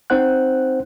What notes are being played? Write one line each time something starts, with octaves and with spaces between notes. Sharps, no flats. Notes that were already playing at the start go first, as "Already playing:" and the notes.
C4 D#4 C5 F#5 F#6